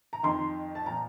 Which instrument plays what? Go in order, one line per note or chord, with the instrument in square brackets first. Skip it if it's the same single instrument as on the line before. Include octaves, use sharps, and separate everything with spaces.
[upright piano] A#5
F2 D#3 C6
A5
A#2 F3 A#5